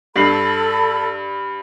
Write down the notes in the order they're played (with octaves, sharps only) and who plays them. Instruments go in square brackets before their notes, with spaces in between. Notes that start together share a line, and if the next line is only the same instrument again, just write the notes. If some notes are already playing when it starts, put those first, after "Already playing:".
[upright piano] G2 C7 F#7 [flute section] A4 B5